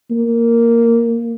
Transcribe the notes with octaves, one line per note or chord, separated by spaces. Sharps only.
A#3